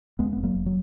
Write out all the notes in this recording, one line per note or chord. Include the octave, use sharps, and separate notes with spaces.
D#2 G#3 B3
F1 B3
F#3 A#3
F1
F#3